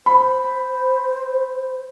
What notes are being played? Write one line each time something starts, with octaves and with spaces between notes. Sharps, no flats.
C5 B5